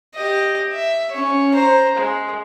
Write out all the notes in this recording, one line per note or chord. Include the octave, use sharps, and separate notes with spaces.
G4 D#5
E5
C#4 C#5
C5 A#5
G#3